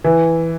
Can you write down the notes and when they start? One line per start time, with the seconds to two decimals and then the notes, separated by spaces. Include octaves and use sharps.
0.04 E3